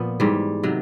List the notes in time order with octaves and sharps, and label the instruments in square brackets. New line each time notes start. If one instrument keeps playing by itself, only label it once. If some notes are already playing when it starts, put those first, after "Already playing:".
Already playing: [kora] A#2 F3 B3
G#2 E3 G3
C3 D#3 F#3